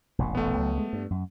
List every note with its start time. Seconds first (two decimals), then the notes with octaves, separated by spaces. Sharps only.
0.18 E1 A1 A#2
0.35 A3 B3
0.57 C#2 F#3
0.78 G#3
0.93 G2
1.10 F#2